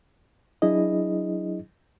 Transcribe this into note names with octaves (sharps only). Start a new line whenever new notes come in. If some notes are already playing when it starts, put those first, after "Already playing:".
F#3 D4 E4 G#4 D#5